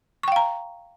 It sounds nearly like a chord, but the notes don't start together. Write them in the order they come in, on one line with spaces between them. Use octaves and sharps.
C#6 G5 F5 A#5